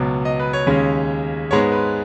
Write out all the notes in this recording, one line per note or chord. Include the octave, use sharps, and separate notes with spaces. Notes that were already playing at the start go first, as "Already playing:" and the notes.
Already playing: C#2 B2 F#3 B3
D#5
B4
C#5
D#2 C#3 G#3 C#4
G#2 G#3 B3 C#5
B4